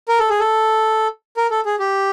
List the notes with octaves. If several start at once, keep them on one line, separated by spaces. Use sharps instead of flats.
A#4
A4
G#4
A4
A#4
A4
G#4
G4